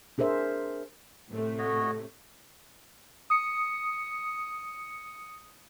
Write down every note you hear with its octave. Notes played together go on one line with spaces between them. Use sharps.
D4 G#4 A#4 C5 E5
A2 C3 A3
F#4 C#5 D#5
D#6 C#7